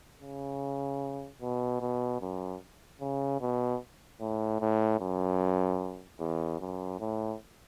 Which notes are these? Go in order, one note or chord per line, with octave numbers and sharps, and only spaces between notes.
C#3
B2
B2
F#2
C#3
B2
A2
A2
F#2
E2
F#2
A2